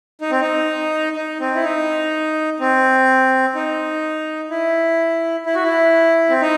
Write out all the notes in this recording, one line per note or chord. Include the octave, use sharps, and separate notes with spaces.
D#4
C4
D#4
D#4
C4
E4
D#4
C4
D#4
E4
E4
F#4
E4
C4
D#4